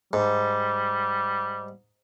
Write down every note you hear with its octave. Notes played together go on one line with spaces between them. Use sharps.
G#2 G3